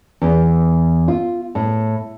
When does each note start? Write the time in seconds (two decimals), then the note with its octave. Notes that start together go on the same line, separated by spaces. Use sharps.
0.22 E2
1.08 F4
1.55 A2